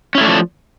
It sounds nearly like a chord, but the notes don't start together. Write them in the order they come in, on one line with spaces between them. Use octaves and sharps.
C#4 E4 A3 D4 F3